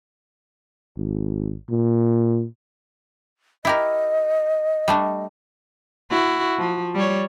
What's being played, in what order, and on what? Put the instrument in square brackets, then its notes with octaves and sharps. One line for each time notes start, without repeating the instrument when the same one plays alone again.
[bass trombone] G#1
A#2
[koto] E4 G4 A#4 [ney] D#5
[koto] G3 A3 D4
[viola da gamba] E4 F#4
F3
G3 C#5